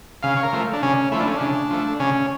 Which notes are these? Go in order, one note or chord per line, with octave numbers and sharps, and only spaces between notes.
C#3 F5
C#5
A#4
F3 A3
D4
C#3 C#4
F3 A3 E4
D4
C#4
C#3 D4
F3 A3
C#3 C#4